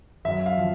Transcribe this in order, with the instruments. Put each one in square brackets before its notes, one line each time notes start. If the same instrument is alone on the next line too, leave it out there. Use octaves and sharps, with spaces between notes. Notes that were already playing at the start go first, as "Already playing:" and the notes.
[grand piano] F#2 E5
F5
F3